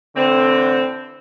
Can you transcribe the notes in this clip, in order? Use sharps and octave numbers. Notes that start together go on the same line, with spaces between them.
A2 D3 E3 C4